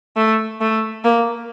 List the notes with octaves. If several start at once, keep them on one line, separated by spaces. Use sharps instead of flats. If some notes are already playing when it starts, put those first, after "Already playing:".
A3
A3
A#3